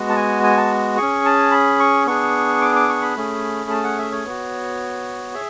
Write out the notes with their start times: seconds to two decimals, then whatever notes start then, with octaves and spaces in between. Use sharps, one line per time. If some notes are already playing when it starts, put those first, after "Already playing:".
Already playing: G#3 B3 F#4
0.10 A5
0.16 G#5
0.43 G#5
0.57 A5
0.97 C#4 G#4 C#6
1.25 A5
1.52 B5
1.80 C#6
2.06 B3 D4 G#4 C#6
2.61 D6
2.76 D6
2.89 C#6
3.02 B5
3.17 A3 C#4 G#4
3.70 A5
3.84 F#5
3.99 E5
4.12 C#5
4.26 B3 F#4
5.34 G#4 E5